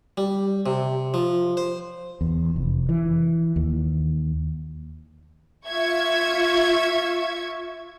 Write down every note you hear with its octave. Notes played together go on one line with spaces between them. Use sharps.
G3
C3
F3
C5
E2
F1
E3
D#2
F4 E5 C#6 G#6